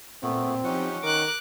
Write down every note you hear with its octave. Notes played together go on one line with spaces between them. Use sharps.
A#2 A3 B3 C4
F3 C#4 D#4 G4 F#5
D#3 A#4 D6 F#6